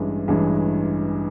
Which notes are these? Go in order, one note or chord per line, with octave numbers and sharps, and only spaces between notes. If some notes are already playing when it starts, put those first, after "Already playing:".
Already playing: A1 G2 E3 G#3
A1 G2 E3 G#3